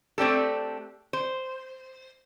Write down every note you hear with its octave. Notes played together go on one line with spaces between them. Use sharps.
A3 C4 D4 G4 A4
C5